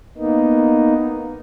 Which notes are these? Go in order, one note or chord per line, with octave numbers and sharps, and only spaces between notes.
A#3 B3 D#4